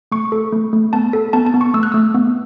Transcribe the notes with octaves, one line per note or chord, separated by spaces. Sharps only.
A3 C#6
A4
A3
A3
B3 A5
A4
B3 A5
A5
B3
C#6
A3 E6
F#6
A3 E6
B3